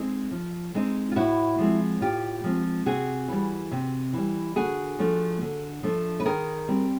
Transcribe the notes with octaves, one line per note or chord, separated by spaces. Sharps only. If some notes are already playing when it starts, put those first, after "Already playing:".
Already playing: G#3 C4 D#4
F3
G#3 C4 D#4
F4
A2 E4 F#4
F3 G#3 C4
A2 F4 G4
F3 G#3 C4
C3 F#4 G#4
E3 G3
C3
E3 G3
D3 F#4 G#4
F3 A3 D4
D3
F3 A3 D4
B4
D#3 G#4 A#4
G3 C4